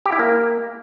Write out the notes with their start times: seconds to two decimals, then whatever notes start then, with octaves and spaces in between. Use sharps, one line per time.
0.06 G4
0.12 E4
0.19 A#3